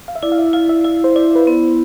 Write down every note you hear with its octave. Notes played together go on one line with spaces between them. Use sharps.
F5
E5
E4 D5
F5
E5
E4 F5
E5
E4 E5
C5
E4 D5
B4
B3 C5